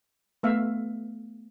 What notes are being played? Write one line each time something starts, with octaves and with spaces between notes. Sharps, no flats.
A3 B3 E5 F5